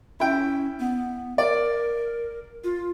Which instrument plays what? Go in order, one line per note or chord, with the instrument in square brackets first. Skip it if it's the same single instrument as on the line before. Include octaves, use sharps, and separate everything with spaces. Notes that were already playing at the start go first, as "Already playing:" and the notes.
[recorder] C#4 [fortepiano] E4 G5
[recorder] B3
[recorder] A#4 [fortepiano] D5
[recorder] F4